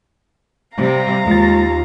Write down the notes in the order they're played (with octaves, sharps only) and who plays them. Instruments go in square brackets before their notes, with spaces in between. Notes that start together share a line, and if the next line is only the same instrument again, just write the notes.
[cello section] C3 G3 [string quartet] F5 A#5
[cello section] D#2 [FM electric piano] G#3 A6 [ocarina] F4